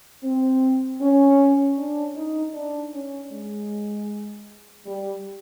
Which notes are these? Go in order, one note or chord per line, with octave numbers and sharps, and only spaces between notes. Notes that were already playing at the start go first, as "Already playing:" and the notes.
C4
C#4
D4
D#4
D4
C#4
G#3
G3